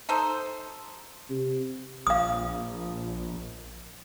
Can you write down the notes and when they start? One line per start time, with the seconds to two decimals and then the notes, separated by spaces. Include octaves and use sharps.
0.09 D#4 A4 C5
1.30 C3
2.07 A#1 F5 D#6